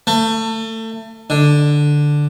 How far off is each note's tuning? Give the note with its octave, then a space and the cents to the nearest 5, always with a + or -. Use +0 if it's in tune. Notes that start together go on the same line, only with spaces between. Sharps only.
A3 +30
D3 +0